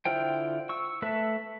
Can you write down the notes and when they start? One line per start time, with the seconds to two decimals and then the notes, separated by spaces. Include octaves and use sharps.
0.05 D3 E4 F4 C5 G5
0.69 C#6 E6
1.02 A3 A4 B4 E5